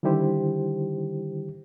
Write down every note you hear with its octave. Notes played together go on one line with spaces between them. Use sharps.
D3 D#3 G3 E4 G4 C5